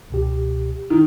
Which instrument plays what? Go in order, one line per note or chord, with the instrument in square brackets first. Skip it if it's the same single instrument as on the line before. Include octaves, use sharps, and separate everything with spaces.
[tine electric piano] C#2 B2 G4
[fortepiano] D#3